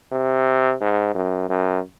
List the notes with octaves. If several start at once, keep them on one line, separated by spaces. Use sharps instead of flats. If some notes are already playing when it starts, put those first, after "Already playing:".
C3
G#2
F#2
F#2